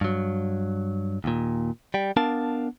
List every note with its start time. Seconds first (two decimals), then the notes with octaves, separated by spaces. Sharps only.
0.01 G2 F#3
1.24 D#2 A#2
1.94 G3 G5
2.17 B3 D4 A#4 F5 A5